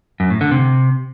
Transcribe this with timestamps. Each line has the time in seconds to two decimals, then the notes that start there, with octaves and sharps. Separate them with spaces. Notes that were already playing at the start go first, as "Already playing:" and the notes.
0.20 F#2
0.30 A2
0.41 D3
0.51 C3